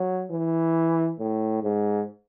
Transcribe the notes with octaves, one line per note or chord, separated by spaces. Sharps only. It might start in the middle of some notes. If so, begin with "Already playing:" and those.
Already playing: F#3
E3
A2
G#2